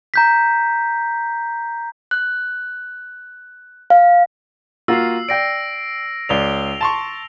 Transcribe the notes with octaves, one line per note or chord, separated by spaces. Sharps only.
A#5 G6 B6
F#6
F5
A#3 F4 F#4 E6 C7
D5 G5 A#6 D7
C#2 D5 F7 G7
A5 C6 C#6